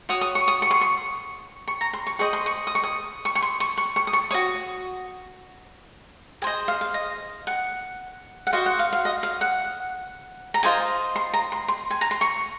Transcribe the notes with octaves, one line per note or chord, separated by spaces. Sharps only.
F#4 C#5 D#6
D#6
C#6
D#6
C#6
C6
C#6
C#6
A#5
C6
C#6
G#4 C5 D#5 C#6
C6
C#6
D#6
C#6
D#6
C#6
C#6
C6
C#6
C#6
C#6
D#6
C#6
F#4 C#5 D#6
G#4 C5 D#5 G#5
F5
F5
D#5
F#5
F#5
F#4 C5 D#5 F5
F#5
F5
F5
D#5
F5
F#5
A#5
F4 C5 D#5 G#5
C6
A#5
C6
C6
G#5
A#5
C6
C#6